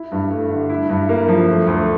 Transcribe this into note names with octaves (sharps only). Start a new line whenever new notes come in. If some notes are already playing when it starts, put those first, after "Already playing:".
Already playing: E4
G2
A3
D3
E4
G2
A#3
F3
A3
D2